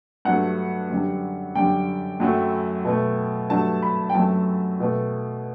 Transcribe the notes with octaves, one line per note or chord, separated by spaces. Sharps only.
G2 F#3 A3 F#5
F#2 D3 G3
F#2 D3 G3 G5
F#2 F#3 A3
B2 A3
G2 F#3 A3 A5
B5
G5
F#2 F#3 A3 A5
B2 A3